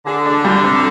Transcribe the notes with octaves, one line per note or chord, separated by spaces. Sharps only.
D3 G#4
D4
G3
C3